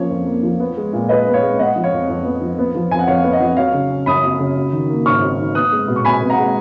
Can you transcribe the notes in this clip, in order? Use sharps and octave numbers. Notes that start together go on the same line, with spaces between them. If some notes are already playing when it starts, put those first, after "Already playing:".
Already playing: F3 A#3 C#4 C#5
F2
A#3
F3
B3
G#3
A#2
A#2 B4 D#5
B3
C#5 F5
G#3
B3 D#5 F#5
F3
C#5 F5
F2
F2
B3
F3
B3
F3
F2 G#5
F#5
F2 C#5 F5
B3
D#5 F#5
F3
F#3 C#5 F5
C#3
C#4
F#2 B5 D#6
F#3
C#3
F#3
D#3
A#3
G#2 C#6 F6
F#3
D#3
B3 D#6 F#6
G#3
B2
C#6
B2 G#5 B5
B3
F#5 A#5
G#3